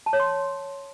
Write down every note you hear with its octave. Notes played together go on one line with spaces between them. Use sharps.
A5
C#5
C6